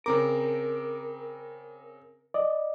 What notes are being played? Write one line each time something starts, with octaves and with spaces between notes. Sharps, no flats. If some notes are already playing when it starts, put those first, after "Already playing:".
C#3 C4 A#4 D6
D5 D#5